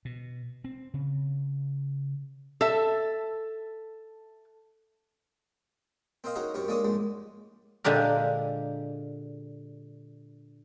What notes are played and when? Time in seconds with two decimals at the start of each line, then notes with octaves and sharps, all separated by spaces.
0.05 B2
0.64 C4
0.94 C#3
2.61 A4 E5
6.24 C4 A#4 C5 D#5 F5
6.36 C#4 D#4 F#4 G#4 A#4
6.54 F#2 C3 A#4 C#5
6.68 G#3 A#3 D4 A#4 C#5 D#6
6.85 A#1 G#2 G#3
7.84 A#2 D3 G#3 G4 A#4